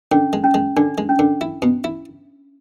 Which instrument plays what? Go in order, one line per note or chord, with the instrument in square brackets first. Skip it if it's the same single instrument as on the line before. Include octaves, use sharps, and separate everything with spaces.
[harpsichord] D3 [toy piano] C#4
[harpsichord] G#3
[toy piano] C#4
[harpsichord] G#3
[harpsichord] D3 [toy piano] D4
[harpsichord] G#3
[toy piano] C#4
[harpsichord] D3
E4
B2
E4